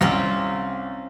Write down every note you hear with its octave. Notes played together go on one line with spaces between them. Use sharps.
C2 C4 C#4 F4